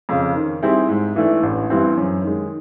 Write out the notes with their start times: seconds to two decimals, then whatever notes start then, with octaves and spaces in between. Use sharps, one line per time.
0.09 F2 C#3
0.36 D#3
0.62 G3 C4 E4 G#4
0.89 G#2
1.16 E3 A3 D4
1.43 A1
1.70 G2 E3 G3 C4
1.97 F#2
2.23 D#3 G#3